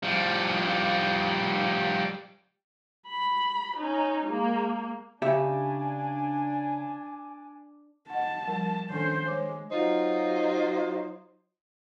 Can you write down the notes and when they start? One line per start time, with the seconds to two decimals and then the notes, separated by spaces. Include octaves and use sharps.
0.03 F3 G3
3.08 B5
3.77 C#4 D#4
4.26 G#3 A#3
5.22 C#3 D4 G4 E5 G#5
8.10 D#5 F#5 A5
8.47 F3 G3 A#4
8.90 D#3 C#4 D4 A4 C5
9.26 G#3 C5 C#5 D6
9.71 F#3 D#4 F4 C5